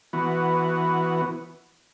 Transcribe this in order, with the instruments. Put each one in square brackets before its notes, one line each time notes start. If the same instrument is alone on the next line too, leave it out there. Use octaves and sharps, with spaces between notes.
[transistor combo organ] E3 B3 F#4